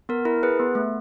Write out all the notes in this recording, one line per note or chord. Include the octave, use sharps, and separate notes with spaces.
B3 A#4
E4 A#4
G#4 B4
B3
A3